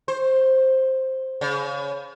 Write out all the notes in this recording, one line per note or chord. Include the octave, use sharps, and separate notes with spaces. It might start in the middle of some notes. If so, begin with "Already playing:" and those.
C5
C#3